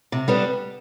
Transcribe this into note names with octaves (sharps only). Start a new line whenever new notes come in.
C3
G3 B3 D4 A4